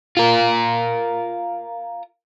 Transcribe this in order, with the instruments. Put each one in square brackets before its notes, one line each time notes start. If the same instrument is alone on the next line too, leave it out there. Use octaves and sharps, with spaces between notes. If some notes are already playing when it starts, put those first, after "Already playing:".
[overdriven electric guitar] F4 A#4